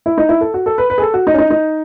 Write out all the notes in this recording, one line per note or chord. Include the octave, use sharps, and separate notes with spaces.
E4
D#4
E4
A4
F#4
A4
B4
B4
G#4
A4
F#4
D#4
C#4
D#4
D#4